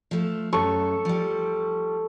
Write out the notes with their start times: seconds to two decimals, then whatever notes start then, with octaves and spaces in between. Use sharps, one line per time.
0.11 F3 A3
0.53 F#2 A4 C#6
1.05 F3 G3